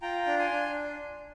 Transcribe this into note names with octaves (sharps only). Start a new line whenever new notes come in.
F4 G5 A#5
D4
G#5 C6
D4